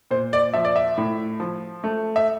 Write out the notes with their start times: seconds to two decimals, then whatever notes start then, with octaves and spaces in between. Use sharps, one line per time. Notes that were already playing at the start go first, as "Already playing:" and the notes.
0.11 A#2 C5
0.33 D5
0.54 F3 E5
0.65 D5
0.76 E5
0.98 A2
1.40 F3
1.84 A3
2.16 E5